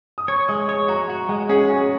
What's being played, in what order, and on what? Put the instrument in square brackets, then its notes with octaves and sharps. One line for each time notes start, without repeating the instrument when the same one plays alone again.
[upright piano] D#6
[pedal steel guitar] C#5 [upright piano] C#6
[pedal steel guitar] G#3 [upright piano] D#6
[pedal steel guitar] C#5 [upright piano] C#6
[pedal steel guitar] F#4 [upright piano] A#5
[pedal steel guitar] F#4
[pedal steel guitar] G#3 [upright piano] F#5
[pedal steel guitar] C#4 [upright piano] G#4
[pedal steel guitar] F#4 [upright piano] G#4